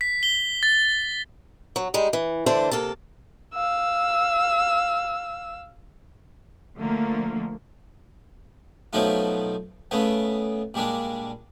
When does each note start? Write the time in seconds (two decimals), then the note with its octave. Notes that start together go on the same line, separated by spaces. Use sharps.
0.01 B6
0.23 G7
0.63 A6
1.76 F#3
1.94 G3 G#3 D#4
2.13 E3
2.46 D3 E3 A3 D4 A4 C5
2.71 C3 A#3 A4 A5
3.55 F5 E6
6.78 D3 F3 A3 A#3
8.93 B2 F3 F#3 A3 D#4 F4
9.91 C#3 A3 B3
10.74 A#2 G3 G#3 D4